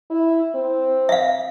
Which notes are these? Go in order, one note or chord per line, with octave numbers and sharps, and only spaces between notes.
E4
C4
E5 F5